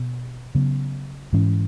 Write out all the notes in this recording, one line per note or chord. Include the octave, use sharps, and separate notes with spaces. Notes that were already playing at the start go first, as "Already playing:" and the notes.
Already playing: B2 B3
C#3 F#3 B3
G#2 E3 C#4